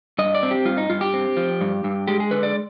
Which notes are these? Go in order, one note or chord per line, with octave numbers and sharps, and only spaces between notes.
G2 D#5
D5
C4
G4
G2 F4
D#4
G2 F4
G4
C4
F3
G2
G2
G#3 G4
G#4
D3 B4
D5